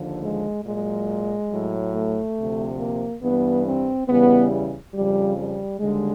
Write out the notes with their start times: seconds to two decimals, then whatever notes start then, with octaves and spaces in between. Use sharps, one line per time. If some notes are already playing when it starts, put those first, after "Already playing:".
Already playing: D#2 D3 F3
0.21 G#3
0.64 A#2 F#3 G#3
1.50 A2 F#3
1.93 A3
2.37 D2 C3 F3
2.78 A#3
3.22 G2 E3 G3 B3
3.65 C4
4.07 E2 C#3 E3 G3 B3
4.94 F2 C#3 F3 G3
5.37 G3
5.79 D#2 D3 G3 G#3